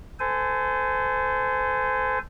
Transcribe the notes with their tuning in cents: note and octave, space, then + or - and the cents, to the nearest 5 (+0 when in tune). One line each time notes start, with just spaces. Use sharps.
A4 +0 C5 -30 G#5 +0